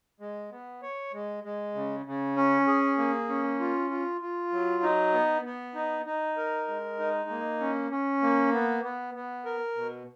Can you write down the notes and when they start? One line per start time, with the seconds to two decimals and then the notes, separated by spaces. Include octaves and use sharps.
0.20 G#3
0.51 B3
0.82 C#5
1.13 G#3
1.44 G#3
1.74 C#3
2.06 C#3
2.36 C#4
2.67 G#4
2.98 A#3
3.29 C#4
3.60 F4
3.90 F4
4.21 F4
4.52 F#3
4.83 D#4
5.14 B3
5.45 B3
5.75 D#4
6.06 D#4
6.37 A#4
6.68 G#3
6.99 D#4
7.30 A#3
7.60 C#4
7.91 C#4
8.22 A#3
8.53 B3
8.83 B3
9.14 B3
9.45 A#4
9.76 B2